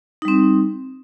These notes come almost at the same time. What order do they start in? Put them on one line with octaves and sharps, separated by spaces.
D#4 G3 C4